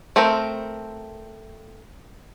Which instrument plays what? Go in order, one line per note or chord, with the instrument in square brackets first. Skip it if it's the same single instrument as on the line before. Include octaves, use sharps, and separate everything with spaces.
[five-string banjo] A3 C4 A#4 C5